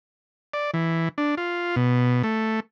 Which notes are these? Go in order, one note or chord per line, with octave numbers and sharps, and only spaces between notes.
D5
E3
D4
F4
B2
A3